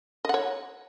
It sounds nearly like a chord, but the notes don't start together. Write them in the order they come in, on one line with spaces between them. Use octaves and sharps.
D#5 F#5 C#5